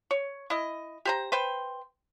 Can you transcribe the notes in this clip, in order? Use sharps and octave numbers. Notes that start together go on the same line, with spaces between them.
C#5
E4 D#5
G4 C5 A#5
B4 C5 G5